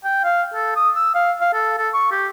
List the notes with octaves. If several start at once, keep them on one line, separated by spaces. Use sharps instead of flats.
G5
F5
A4
D#6
E6
F5
F5
A4
A4
C#6
G4